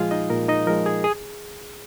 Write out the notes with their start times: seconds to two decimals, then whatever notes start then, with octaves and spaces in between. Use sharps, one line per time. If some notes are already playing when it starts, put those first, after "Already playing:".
Already playing: A#2 F3 G#3 F4 G#4 F5 G#5
0.11 D#4 D#5
0.30 A#2 A#4
0.48 D#4 D#5
0.67 F3 G#3 A#4
0.86 G#4
1.04 G#4